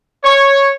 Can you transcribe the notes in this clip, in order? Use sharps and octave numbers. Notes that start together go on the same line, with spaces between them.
C#5